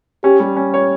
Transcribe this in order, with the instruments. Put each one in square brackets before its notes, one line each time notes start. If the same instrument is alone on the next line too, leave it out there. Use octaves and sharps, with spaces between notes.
[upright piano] C#4 [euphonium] G4
[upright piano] G3
C#4
C#5